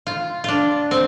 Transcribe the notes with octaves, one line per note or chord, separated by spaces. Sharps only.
F4
D4 F4
C4